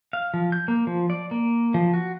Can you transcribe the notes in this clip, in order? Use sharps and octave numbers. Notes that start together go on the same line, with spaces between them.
F5
F3
G6
A#3
F3
D5
A#3
F3
F#4